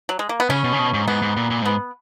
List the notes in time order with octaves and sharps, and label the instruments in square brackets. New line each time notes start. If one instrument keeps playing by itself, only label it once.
[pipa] F#3
G#3
A#3
B3
[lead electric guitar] C#3 [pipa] C#4
[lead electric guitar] B2
C#3
B2
G#2
[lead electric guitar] G#2 [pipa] B3
[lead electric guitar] G#2
A#2
A#2
[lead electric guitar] G#2 [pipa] B3